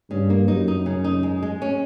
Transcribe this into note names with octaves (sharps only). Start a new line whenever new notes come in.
G2 C#3
A#3
F#2 D#4
D#4
C#3
D#4
G#3
G#3
C#4